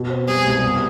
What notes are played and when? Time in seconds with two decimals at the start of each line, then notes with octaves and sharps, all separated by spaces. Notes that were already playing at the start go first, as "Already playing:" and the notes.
Already playing: B2
0.10 C4
0.27 G3 G#4
0.46 C2
0.63 B3